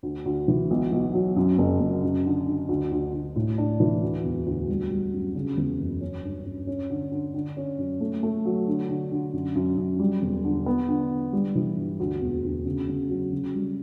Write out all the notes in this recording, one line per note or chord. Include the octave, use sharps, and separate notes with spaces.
D2
D2
E3
B1
B1
F#3
F#2
F#1
F#1
F#2
D3
D3
D2
D2
D2
A2
D4
E3
D2
E1
D2
G3
G3
F#2
C#3
E2
F#1
C#4
G2
C#4
C#4
D3
D3
D3
C#4
F#2
A3
A3
F#3
D3
D3
D3
F#2
F#2
F#2
G3
E1
D3
B3
D3
D3
G3
E3
G2
D2
E1
D2
C#3
C#3
F#3
C#3
G3